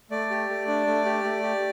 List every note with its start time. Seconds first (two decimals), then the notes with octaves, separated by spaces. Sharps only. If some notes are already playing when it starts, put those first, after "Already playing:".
0.11 A3 D5
0.30 G4
0.49 A3
0.67 D4
0.87 A3
1.05 G4
1.24 A3
1.43 G4